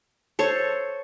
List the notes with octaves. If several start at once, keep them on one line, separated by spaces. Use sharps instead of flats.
A4 C5 C#5